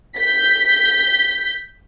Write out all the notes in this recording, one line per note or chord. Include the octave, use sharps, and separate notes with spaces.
G6 B6